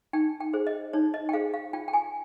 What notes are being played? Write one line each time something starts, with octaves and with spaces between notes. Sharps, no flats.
D#4 G5
G5
G#4 C5
D#5
D#4 C#5
D#5
G5
G#4 C5 F5
F5
F4 G5
G5
G#5